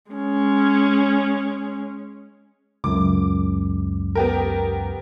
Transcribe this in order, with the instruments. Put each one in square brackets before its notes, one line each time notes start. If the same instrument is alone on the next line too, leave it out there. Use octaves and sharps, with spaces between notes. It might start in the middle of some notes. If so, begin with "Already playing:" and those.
[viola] G#3 C#4
[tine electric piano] C#2 F#2 [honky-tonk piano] D6
[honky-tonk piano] B3 G4 A#4